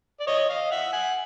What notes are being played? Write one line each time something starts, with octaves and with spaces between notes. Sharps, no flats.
D5
C#5 D#5
D#5 F5
E5 F#5
F#5 G#5